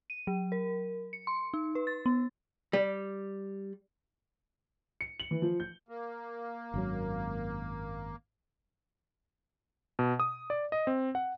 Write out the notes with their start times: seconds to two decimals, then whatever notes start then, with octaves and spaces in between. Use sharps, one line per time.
0.10 D#7
0.27 F#3
0.52 A#4
1.13 C#7
1.27 C6
1.54 D#4
1.75 B4
1.87 A6
2.06 B3
2.73 G3
5.01 C#7
5.20 F#7
5.31 E3
5.42 F3
5.60 G6
5.89 A#3
6.74 G#1 F#2 F#3
9.99 B2
10.20 D#6
10.50 D5
10.72 D#5
10.87 C4
11.15 F#5